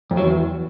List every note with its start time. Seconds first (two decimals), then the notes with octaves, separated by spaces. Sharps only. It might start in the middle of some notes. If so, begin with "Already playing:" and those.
0.11 F2
0.17 F#3
0.24 E2